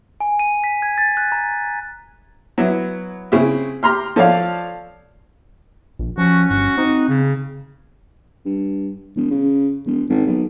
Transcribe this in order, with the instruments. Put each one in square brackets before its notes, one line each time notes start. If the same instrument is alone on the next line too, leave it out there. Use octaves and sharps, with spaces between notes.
[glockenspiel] G#5
D#7
B6
G#6
A6
F#6
A#5
[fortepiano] F#3 B3 E4
C#3 C4 E4
G4 A#5 C6 F6
F3 A4 C#5 D5 F5
[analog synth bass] A#1
[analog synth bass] F3 [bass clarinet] C#4 [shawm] F#4
[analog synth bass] G1 [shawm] F#4
[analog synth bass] C4 [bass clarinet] D#4
[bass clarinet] C#3
[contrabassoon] G2
E1
C#3
E1
G#1
B1